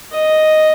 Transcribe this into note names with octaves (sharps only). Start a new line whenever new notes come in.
D#5